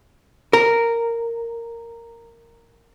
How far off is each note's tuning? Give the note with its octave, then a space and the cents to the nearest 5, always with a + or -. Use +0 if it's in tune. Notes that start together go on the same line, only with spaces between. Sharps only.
A#4 -10